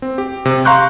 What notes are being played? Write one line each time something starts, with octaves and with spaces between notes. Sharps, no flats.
C4
G4
C3
F5 A#5 C6 C#6 F#6 G6